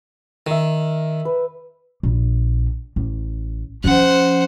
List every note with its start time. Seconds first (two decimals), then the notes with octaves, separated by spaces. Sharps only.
0.47 D#3 A#4 E5
1.25 B4
2.03 A#1
2.96 A1
3.84 F3 C#4 C5 F#5